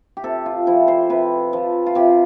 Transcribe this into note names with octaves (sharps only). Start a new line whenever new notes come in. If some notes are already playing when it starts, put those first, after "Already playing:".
G4
C3 A4
F4
F3 E4
C5
C3 B4
F3
F4
C3 G4